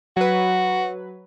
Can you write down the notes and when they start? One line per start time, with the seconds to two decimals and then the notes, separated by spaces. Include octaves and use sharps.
0.17 F#3 F#4 B4